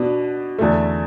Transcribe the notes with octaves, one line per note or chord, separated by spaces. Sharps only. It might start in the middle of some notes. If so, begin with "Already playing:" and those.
Already playing: B2 B3 D4
E2 D3 A3